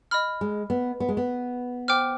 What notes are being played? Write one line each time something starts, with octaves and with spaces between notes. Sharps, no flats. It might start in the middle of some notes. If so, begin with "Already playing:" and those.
D#5 B5 F6
G#3
B3
B3
G#3
B3
C5 G5 D6 F6